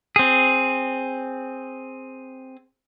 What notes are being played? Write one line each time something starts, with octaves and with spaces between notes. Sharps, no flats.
C4 G#4